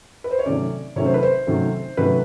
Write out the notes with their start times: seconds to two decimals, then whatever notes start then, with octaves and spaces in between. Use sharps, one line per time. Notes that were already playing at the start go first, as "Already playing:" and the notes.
0.24 B4
0.31 C5
0.39 C#5
0.46 C3 D#3 F#3 A3 C#4 D5
0.96 C3 D#3 F#3 A3 C#4 C#5
1.05 C5
1.14 B4
1.23 C5
1.47 C3 D#3 F#3 A3 C#4
1.97 C3 D#3 F#3 A3 C#4 B4